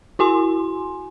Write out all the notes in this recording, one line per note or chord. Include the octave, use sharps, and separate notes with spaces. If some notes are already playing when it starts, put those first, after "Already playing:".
E4 F#4 G#5 C6